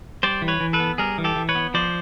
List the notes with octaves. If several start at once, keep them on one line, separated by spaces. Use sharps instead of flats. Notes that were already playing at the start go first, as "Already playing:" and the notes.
G3 C5 D5
E3
B4 C#5
E3
A4 B4
B3
G3 G#4 A#4
E3
G4 A4
E3
B4 C#5
B3
F3 C5 D5